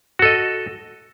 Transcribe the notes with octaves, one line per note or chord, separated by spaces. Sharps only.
F#4 A4 D#5